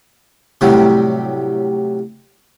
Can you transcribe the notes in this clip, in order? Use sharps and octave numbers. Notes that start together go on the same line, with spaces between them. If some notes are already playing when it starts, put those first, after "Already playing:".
A2 C3 F#3 G3